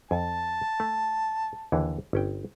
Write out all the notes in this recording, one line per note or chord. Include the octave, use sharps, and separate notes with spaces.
F2 A5
A3
D#2 D3 E3
G1 C#4 G5